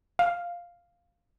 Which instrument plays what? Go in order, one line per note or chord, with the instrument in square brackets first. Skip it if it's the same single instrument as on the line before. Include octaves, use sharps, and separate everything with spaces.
[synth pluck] F5